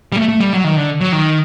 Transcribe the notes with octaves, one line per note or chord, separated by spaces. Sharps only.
G3
A3
A3
G3
F#3
D#3
D3
F#3
D#3